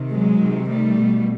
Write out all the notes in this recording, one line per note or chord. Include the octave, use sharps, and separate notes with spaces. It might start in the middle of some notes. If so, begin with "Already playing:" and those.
Already playing: C3 D#3
F#3 G#3
C3 D#3
G3 A3
B2